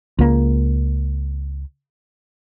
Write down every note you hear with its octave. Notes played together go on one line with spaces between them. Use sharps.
C#2 A#3